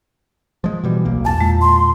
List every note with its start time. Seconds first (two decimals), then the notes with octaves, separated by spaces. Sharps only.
0.64 F3 G#3
0.84 B2 E3 G3
1.05 D1 B1 A#3
1.25 E2 A5 A6
1.41 A#2 G#3
1.61 C6